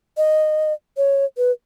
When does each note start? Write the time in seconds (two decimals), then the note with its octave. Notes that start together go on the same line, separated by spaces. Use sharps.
0.17 D#5
0.97 C#5
1.37 B4